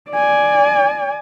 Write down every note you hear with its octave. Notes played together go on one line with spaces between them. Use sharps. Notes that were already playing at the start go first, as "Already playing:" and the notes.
D5 G#5